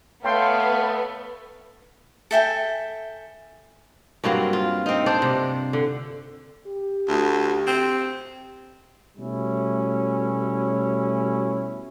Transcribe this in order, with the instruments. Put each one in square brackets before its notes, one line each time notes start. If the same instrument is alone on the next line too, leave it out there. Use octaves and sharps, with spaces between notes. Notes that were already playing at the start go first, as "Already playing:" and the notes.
[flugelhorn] A3 [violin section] B3 [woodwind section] C#5 F5 [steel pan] G5 C6
[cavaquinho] A4 E5 G5 G#5
[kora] G2 F#3 A#3 C4
F4
C4 D#4
D4 C5 D5
C3
D3
[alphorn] G4
[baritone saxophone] D2
C4
[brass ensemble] B2 G3 A3 C#4 E4